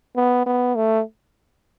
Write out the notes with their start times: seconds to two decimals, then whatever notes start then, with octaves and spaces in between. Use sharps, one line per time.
0.17 B3
0.46 B3
0.76 A3